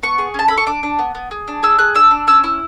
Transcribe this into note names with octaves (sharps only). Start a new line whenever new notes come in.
B3 C#6
G#4
C#4 A5
A4 B5
C#6
D4 D6
D4
B3
B3
G#4
D4
G#4 E6
G#4 F#6
D4 E6
D4
C#4 E6
E4